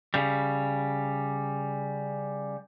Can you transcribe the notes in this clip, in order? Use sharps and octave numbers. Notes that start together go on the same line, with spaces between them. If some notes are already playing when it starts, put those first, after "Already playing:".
C#3 G3